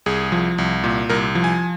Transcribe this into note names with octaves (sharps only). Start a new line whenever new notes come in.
C2 G#4
F3
C2
A#2
C2 A#4
F3
G#5